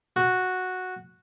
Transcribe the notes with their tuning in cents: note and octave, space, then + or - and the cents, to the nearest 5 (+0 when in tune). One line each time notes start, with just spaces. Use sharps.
F#4 -5